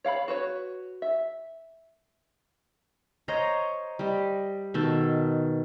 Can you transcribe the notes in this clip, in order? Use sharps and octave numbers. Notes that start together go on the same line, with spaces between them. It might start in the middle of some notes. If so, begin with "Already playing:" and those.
C#5 F5 F#5 B5
F#4 B4 C#5
E5
C5 C#5 D#5 A#5
G3 D#5
B2 D#3 A4